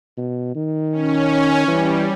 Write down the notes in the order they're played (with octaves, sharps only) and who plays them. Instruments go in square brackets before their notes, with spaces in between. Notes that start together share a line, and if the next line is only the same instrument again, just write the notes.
[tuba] B2
D#3
[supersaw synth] C#4
[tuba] E3 [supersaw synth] G3